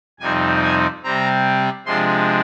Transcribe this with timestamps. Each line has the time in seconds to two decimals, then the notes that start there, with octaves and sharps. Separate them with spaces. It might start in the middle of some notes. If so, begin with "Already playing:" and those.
0.19 F2 C3 G3 C4 D#4 G#5
0.62 G#5
1.03 C3 G3 C4 A#5
1.85 C3 F3 G#3 D4 C6